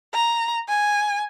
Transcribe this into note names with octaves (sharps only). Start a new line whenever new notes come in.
A#5
G#5